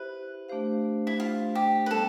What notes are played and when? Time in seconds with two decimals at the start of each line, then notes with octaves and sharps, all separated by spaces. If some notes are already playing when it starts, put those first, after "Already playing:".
Already playing: E4 G4 B4 C5 E5
0.49 A3 D4 G4 C5 F5
1.07 E4
1.20 F4
1.55 G4
1.86 B4
1.91 G3 B3 A4